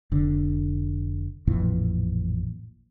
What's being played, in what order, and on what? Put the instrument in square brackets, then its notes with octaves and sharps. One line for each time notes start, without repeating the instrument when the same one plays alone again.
[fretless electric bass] F1 D3
A1 F2 A#2 E3